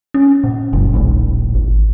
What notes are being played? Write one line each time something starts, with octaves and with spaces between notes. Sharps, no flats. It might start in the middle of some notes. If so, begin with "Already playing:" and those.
C#4
A#2
F#1
D#1 A#1 A2
G#1